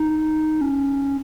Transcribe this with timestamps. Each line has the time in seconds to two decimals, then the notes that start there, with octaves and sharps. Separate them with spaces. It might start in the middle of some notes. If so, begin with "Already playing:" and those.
Already playing: D#4
0.61 C#4